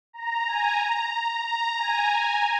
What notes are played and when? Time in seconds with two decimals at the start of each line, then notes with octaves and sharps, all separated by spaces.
0.13 A#5
0.47 G#5
0.80 A#5
1.46 A#5
1.79 G#5